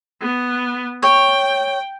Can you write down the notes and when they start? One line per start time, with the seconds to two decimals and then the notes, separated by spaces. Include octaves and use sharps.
0.22 B3
1.03 C#5 G5